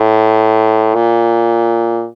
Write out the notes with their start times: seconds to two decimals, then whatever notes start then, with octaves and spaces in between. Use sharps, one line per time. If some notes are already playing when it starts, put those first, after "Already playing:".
Already playing: A2
0.95 A#2